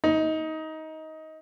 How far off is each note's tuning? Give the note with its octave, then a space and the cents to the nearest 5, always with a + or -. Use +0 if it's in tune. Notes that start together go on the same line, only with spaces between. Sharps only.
D#4 +20